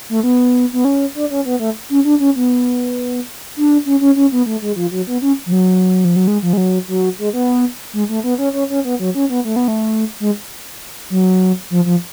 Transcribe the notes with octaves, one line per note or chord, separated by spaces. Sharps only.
A3
B3
B3
C#4
D4
C#4
B3
A3
C#4
D4
C#4
B3
D4
C#4
C#4
C#4
B3
A3
G#3
F3
F#3
B3
C#4
F3
F#3
F3
F#3
G#3
F3
G#3
F#3
F#3
G#3
B3
G#3
A3
B3
C#4
C#4
C#4
B3
F#3
C#4
B3
A3
B3
A3
G#3
F#3
F3
F3